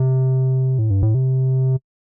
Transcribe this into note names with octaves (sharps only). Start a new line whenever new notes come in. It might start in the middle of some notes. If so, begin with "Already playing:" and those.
Already playing: C3
A2
G2
A2
C3